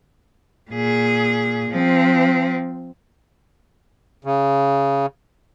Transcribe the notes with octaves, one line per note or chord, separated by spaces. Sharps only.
A#2 G#4
F3 C4
C#3